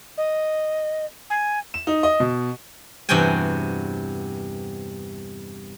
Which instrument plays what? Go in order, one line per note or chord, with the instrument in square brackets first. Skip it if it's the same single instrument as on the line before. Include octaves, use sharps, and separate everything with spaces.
[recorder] D#5
G#5
[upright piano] E7
D#4
D#5
B2
[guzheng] E2 G2 C3 F#4 G5 G#5